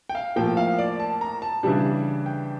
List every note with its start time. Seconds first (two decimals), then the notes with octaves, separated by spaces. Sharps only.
0.09 G5
0.15 F5
0.36 A2 F3 A#3 G5
0.57 F5
0.79 D5
1.00 A5
1.21 A#5
1.42 A5
1.63 C#3 E3 G3 D4
2.26 G5